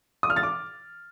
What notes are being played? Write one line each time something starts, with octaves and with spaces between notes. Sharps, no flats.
D#6
F6
A6
D6